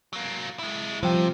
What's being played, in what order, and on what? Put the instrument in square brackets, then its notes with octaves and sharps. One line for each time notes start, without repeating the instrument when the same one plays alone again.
[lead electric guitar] F#3 A#3
G#3 E4
[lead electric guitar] C3 [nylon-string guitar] F3 [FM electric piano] G3 G5